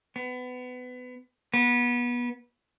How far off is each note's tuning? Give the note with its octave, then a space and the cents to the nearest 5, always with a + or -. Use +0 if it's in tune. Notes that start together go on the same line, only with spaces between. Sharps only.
B3 +25
B3 -25